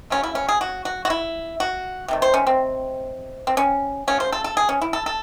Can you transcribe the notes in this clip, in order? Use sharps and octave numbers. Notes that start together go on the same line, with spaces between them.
C#3 F#3 A3 C#4
E4
C#4
G#4
F#4
F#4
F#4
E4
F#4
C3 D#3 A3
C5
C#4
C4
C4
C#4
C#3 F#3 A3 C#4
C5
A4
A4
G#4
C#4
E4
A4
A4